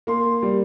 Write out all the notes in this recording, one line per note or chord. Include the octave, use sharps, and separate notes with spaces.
A#3 C6
G3